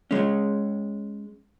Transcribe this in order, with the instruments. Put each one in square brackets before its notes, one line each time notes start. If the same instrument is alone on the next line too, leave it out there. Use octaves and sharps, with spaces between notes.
[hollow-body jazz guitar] G#3 C#4